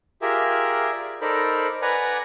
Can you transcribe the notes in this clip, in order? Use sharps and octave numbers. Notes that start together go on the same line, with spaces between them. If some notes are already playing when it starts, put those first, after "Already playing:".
F4 G4 G#4 A#4 E5
D5
D#4 A4 A#4 C5 D5 B5
B4 D5 F#5 G#5 A#5 B5